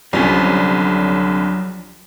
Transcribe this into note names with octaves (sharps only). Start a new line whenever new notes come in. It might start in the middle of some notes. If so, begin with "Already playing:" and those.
C2 D3 F3 F#3 C#4